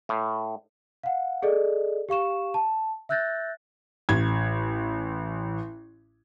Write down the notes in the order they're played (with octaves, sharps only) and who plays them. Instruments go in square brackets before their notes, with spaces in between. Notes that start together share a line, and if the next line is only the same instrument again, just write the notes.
[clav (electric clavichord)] A2
[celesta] F5 F#5
G#4 A4 D5 D#5
G4 F5 C#6 E7
A5
E5 E6 F#6 G6 A6 A#6
[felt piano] A1 G#6